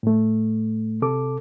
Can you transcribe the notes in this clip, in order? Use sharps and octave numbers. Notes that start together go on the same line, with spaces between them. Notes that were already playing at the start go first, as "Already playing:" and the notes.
A2 A3
C3 A4 D6